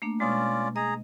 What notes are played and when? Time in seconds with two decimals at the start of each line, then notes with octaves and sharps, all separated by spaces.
0.02 A3 A#3 D4
0.20 B2 G#3 C#4 F4 D5
0.76 G#4 D#5 A#5